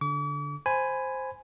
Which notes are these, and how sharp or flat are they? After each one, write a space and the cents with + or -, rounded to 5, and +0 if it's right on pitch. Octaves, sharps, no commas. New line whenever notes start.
D3 -15 D6 -45
C5 +0 G#5 +0 B5 +15